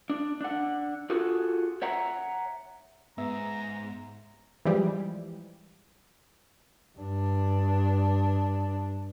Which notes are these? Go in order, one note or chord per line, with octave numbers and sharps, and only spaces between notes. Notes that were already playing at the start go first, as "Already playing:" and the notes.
D4
D4 F#5
F4 F#4 G#4 A4
C#5 E5 F#5 A#5
G#2 B3 E5 A#5
E3 F3 G3 G#3
G2 D4